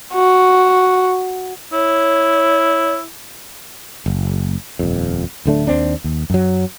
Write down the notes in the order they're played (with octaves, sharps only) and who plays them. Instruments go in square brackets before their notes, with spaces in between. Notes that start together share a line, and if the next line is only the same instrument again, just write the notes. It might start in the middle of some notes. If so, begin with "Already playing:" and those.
[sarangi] F#4
[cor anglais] E4 [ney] C#5
[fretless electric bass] F#1
D#1 F2
D1 D3 A3 D4
D#2 C4 D4
D#2
F#2 F#3